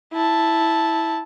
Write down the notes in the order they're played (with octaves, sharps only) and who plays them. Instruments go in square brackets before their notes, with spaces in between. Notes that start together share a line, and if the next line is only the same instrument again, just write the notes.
[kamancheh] E4 A5